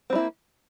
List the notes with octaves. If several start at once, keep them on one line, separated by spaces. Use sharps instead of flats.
G3 A#3 C4 E4